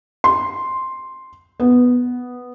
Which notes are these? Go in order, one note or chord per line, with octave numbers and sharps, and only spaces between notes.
C6
B3